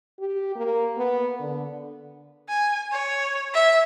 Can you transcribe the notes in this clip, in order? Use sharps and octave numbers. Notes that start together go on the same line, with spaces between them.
G4
A#3
B3
D3
G#5
C#5
E5